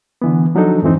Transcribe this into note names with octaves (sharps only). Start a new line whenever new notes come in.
D3 E3 B3
F3 F#3 D4 D#4 A4
F2 G#2 E3 C4 D#4